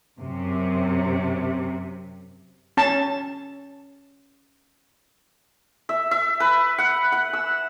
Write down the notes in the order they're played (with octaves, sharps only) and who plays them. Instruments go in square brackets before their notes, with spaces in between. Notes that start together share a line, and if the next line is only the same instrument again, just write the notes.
[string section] F#2 C3
[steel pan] C#4 A5
[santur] E5
E5
B4
F#5
F#5
E6